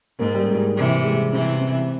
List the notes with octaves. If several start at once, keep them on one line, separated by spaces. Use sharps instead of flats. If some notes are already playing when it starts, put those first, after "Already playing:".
G#2 A#3
G3
G#3
C3 E3 G3
G#3
C3 E3 C4
C4